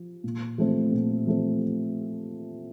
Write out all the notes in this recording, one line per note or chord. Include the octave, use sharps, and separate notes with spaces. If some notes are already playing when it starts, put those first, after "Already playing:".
Already playing: F3
A#2
F3 A3 C4
A#2
F3 A3 C4